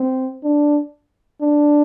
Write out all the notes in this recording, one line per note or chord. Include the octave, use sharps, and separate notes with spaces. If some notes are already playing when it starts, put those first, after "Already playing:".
Already playing: C4
D4
D4